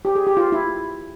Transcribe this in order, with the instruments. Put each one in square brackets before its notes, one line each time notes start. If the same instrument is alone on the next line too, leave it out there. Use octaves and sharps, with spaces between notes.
[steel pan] G4
G#4
G4
F4
E4